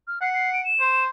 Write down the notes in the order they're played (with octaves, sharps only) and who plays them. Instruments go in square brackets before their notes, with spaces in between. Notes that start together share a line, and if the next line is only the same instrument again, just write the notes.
[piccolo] F6
[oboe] F#5 [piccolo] C7
[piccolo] C7
D7
E7
[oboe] C5